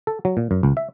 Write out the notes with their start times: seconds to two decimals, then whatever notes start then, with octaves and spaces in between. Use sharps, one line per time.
0.07 A4
0.25 F#3
0.37 A#2
0.51 F#2
0.63 C#2
0.77 E5